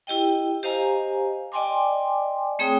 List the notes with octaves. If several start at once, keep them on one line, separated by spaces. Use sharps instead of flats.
E4 G4 D#5 G5
G4 C5 D#5 F5 G#5 A#5
D5 D#5 G5 G#5 C6 D6
A3 C4 G#4 C#5 G5 D#6